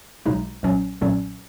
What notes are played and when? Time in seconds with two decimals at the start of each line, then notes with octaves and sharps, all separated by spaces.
0.26 B1 B2 G#3 D#4
0.63 B1 A#2 F#3 C#4
1.01 B1 A#2 F#3 C#4